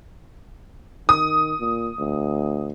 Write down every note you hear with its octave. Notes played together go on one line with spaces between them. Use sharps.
D#3 D#6
A#2
D2